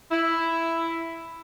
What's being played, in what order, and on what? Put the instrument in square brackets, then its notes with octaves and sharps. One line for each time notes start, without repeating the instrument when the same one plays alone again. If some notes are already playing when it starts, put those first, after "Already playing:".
[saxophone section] E4